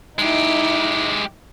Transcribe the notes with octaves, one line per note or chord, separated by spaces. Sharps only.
G#3 D#4 E4 G4